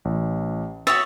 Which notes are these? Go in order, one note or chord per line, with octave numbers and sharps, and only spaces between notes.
A1
F#4 C#5 E5 D#6 A6